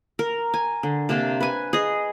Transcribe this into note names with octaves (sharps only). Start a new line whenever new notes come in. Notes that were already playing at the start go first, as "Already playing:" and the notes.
A#4
G#5
D3
C3 A#3 D4
B4 G#5
G#4 D#5